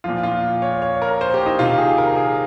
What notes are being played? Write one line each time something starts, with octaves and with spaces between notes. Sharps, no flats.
A#2 F3 F4
F4
C#5
C#5
A#4
C5
G4
D#4
C3 D#3 F4
G#4
A#4
G#4